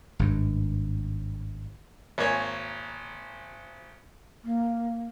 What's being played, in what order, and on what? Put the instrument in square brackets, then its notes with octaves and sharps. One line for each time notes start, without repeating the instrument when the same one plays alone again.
[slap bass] G#1 G2
[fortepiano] G#1 A#3 C#5 G#5
[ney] A#3